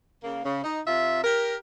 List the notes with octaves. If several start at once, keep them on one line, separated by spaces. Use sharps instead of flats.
C#3 A#3
C#3
D#4
C3 F4 E5
G4 A#4